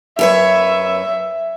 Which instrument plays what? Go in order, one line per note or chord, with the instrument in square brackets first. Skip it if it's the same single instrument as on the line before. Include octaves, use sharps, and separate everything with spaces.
[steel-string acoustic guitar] F#2 B4 C#5 [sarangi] E5